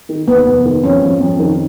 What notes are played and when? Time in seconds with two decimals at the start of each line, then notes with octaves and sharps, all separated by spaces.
0.09 D#3
0.28 D#2 B3
0.46 F1
0.65 D#3
0.84 F2 C#4
1.02 F2
1.21 F2
1.39 D#3